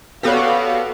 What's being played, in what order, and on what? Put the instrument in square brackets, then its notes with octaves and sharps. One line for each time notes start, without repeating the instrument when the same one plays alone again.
[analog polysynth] B3 F#4 G4 [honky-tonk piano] A4 C#5 [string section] D5 F5